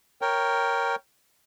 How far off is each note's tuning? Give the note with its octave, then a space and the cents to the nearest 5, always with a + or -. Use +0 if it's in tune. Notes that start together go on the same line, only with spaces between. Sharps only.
A#4 +0 C#5 +0 G5 +0